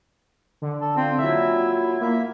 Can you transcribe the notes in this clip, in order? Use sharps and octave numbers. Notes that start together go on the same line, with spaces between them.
D3
A4
C4 F4
A#2 F#3 E4 E5
A#3 E5